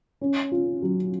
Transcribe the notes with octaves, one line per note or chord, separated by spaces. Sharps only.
C#4
F4
F#3